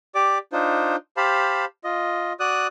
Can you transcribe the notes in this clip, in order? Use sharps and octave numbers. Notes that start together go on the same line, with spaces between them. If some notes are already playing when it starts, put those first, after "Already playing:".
G4 D5 D6
D4 D#4 F4 C5
G4 C5 F5 A5 B5
F4 D#5
F#4 D5 D#6 F#6